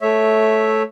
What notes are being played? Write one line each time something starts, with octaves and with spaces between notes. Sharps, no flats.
A3 C#5 E5